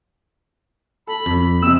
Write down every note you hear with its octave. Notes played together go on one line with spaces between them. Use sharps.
A4 B5
F2
F2 C3 E6 E7